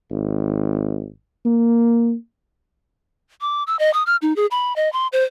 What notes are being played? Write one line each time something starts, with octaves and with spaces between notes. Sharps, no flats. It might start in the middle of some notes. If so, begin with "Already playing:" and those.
G#1
A#3
D6
E6
D#5
D#6
F6
D#4
G#4
B5
D#5
C6
C5